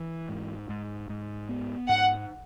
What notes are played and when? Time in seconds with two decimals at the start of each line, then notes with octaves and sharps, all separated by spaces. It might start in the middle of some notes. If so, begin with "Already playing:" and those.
Already playing: E3
0.29 G#2
0.69 G#2
1.09 G#2
1.49 B3
1.88 G#2 F#5